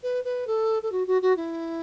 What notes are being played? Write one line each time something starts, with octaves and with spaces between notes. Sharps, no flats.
B4
B4
A4
A4
F#4
F#4
F#4
E4